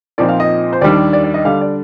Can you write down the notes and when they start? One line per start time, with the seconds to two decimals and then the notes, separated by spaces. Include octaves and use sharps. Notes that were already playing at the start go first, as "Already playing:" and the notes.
0.18 A#2 F3 C4 D#4 D5
0.29 F5
0.40 D#5
0.73 C5
0.81 D#2 D#3 G3 D4 D5
1.13 D5
1.24 D5
1.34 D#5
1.45 D3 G3 D4 F5
1.61 D5